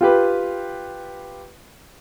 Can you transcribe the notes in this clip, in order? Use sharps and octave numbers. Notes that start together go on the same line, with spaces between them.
F4 G4 B4